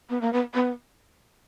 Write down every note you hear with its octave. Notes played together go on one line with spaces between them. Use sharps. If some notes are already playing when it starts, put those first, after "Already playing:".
B3
A#3
B3
B3